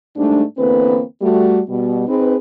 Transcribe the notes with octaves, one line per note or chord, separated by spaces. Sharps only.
G#2 G3 A3 D4
E2 D3 A#3 C4 B4
G3 A3 F#4
B2 G3
C4 D#4 G#4 B4